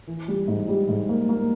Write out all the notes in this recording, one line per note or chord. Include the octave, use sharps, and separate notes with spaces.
E3
G3
G#2
G3
G#2
A#3
A#3